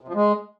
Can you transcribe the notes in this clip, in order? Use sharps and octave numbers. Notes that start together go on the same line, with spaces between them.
C3
F3
G#3